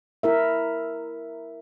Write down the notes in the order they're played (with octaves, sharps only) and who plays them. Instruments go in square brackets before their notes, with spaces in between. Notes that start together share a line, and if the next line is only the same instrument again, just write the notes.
[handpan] E4 A#4 E5